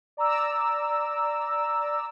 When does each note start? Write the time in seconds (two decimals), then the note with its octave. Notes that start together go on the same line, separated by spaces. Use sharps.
0.17 D5 A#5 D6 E6